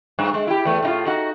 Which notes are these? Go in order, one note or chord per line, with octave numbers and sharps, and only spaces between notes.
G2
G#3
E4 G4
E2 A3
A2 D#4 F4
D#4 F#4